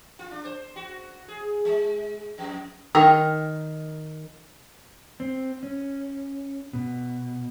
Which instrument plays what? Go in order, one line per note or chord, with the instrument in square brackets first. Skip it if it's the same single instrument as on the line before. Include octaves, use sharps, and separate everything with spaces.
[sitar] F4
D4
C5
F#4
G#4
G#3
F2
[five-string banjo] D#3 A#4
[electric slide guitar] C4
C#4
B2